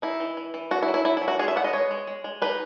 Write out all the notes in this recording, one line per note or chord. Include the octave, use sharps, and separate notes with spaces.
D#4 E4
E3
E3
E3
B3 F#4
E4
F#3
E4
F#3 E4
E4
F#3
F#4
G#3 G#4
E5
B3 F#5
D#5
G#3 C#5
G#3
G#3
G#3
D#4 B4